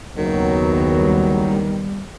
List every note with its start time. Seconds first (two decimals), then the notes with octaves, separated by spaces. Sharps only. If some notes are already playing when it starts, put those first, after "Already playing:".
0.17 F#1 D#2 D#3 F#3 B3
0.98 G3